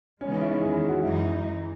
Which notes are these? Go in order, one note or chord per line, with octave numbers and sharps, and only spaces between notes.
C#3 E3 G#3 B3 C#4
D#4
E4
E2 D#3 G#3 G#4
F#4
F#2 E3 G#3 D#4 E4
E3 G#3